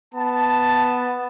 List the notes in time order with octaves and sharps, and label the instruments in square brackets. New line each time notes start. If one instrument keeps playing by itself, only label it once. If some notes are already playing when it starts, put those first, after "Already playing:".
[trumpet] B3 [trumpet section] A5